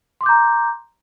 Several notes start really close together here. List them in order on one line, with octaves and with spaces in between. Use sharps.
C6 D6 G6 A#5